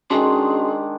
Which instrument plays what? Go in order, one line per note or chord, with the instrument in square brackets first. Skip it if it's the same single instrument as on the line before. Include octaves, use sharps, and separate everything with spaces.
[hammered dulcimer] D#3 G#3 D4 [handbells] C#4 F#4 C6 [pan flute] G#4